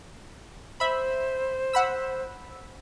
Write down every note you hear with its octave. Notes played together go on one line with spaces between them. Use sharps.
C5 E5 B5
F#5 B5 E6